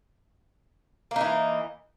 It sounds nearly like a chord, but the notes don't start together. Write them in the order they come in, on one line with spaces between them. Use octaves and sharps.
A#3 D#4 E3